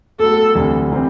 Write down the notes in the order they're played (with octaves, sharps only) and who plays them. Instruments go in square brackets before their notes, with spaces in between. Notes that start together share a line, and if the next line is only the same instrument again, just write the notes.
[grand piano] A2 F#3 B3 F#4 [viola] A4
[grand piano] D2 C3 E3 G3
C3 E3 G3 C4